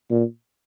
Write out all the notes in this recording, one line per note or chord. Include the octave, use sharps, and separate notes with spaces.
A#2